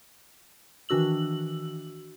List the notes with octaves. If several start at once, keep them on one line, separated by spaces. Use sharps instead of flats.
D#3 E3 D4 F#4 E6 F#7